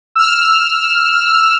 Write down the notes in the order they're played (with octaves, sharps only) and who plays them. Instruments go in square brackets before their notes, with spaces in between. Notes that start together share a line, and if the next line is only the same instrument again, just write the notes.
[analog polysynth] E6 F6